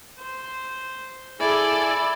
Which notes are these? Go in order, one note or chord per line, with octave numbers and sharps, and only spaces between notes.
C5
E4 G#4 A4 D5 G#5